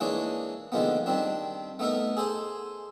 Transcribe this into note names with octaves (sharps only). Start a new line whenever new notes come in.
E3 G#3 A#3 D4 D#4 C#5
D3 D#3 F3 G#3 A#3 B3
D#3 G3 C4 D4
A3 B3 D#4 A4 A#4
G#4 A4 C5 G#5